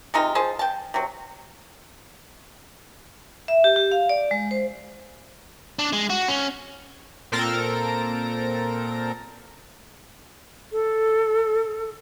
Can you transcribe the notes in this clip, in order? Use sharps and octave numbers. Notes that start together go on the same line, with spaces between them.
C3 G#3 D#4 F4
F3 G#4 C5 A5
G5 A5
C3 F#3
E5
G4
G4
F5
D5
G#3
C5
D4
G#3
F#4
C#4
A#2 C4 A4 A#4 A#6 D7
A4